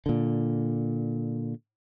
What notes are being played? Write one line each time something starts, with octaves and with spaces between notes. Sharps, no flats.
A#2 D3